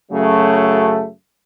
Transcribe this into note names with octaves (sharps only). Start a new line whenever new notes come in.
F#2 C#3 F#3 A3